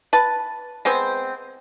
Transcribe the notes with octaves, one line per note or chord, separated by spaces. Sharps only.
B4 A5
G#3 B3 C4 C5